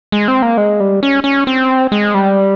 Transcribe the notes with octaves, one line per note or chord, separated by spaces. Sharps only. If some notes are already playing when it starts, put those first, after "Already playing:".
G#3
C4
A#3
G#3
G3
C#4
C#4
C4
G#3
G3